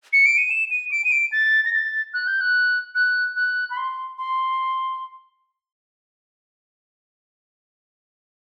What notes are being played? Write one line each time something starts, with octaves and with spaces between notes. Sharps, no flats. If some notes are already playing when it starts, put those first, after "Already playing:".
C#7
D7
D#7
E7
D#7
D7
D#7
D7
A6
A#6
A6
F#6
G6
F#6
F#6
F#6
B5
C6
C6